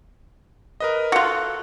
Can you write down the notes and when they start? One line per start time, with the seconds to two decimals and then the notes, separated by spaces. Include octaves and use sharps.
0.80 A#4 B4 D#5
1.12 F4 F#4 A4 F#6